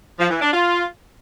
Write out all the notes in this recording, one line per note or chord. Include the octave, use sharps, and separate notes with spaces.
F3
E3
D4
F4